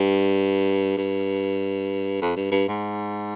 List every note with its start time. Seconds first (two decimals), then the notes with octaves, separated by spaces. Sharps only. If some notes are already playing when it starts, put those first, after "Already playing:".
Already playing: G2
0.97 G2
2.22 F2
2.36 G2
2.52 G2
2.68 G#2